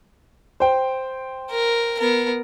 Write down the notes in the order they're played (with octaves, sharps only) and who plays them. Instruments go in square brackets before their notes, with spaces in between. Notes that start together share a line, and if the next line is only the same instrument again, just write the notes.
[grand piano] C5 G5
[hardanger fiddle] A#4
B3 A#4